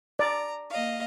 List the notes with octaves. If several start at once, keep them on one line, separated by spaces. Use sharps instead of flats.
D5 A#5
A#3 D#5 F5